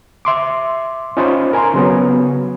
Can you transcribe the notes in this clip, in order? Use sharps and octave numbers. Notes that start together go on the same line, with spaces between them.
E5 C6 D6
C#4 D#4 F4 C5 B5 C#6
A#4 G#5 A#5 C6
C#3 F#3 B3